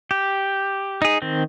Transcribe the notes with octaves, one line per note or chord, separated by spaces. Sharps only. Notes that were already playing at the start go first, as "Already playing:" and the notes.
G4
D#4 G#4
D#3 C4